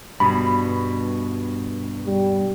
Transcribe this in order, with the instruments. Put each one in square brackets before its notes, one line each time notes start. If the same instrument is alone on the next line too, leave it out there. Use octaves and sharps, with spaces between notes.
[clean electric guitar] G2 B2 [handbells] B5
[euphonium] G3